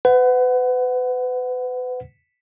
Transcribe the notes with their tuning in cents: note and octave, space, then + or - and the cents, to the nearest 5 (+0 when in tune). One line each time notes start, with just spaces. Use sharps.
B4 +35 F#5 +0